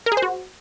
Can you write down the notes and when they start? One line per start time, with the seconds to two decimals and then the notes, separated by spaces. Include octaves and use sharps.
0.06 A#4
0.12 G#4
0.17 C5
0.22 F#4